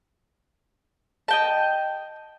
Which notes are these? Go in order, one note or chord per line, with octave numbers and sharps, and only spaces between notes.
D#5 G5 A5